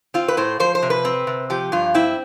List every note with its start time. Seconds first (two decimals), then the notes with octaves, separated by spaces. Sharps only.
0.14 C4 F4
0.28 B4
0.37 A2 C5
0.60 F3 C5
0.75 C5
0.82 C3
0.90 B4
1.05 C4
1.27 C3
1.50 F3 G4
1.72 G2 F4
1.94 C4 E4